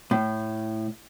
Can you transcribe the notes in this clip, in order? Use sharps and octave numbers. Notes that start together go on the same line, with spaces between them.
A2